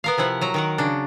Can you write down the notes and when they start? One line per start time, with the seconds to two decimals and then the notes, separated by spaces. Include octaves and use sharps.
0.04 B3 A#4 F5
0.18 C3 F3 E4 F#5
0.41 F#3 A#5
0.54 D#3 A#4 F#5
0.78 C#3 D4